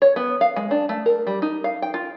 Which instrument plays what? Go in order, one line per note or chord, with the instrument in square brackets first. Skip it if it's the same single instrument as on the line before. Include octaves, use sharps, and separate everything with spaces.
[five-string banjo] C#5
B3
F5
G#3
D4
A3
A#4
G3
D#4
F5
G5
F4